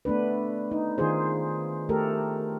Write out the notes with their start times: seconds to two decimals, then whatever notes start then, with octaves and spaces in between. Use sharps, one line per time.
0.05 A3 B3 D4 B4
0.72 D#4
0.98 D#3 D#4 F4 G#4 C5
1.89 A3 G4 A4 A#4